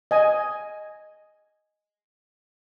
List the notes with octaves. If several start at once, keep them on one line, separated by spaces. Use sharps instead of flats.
D#5 G#5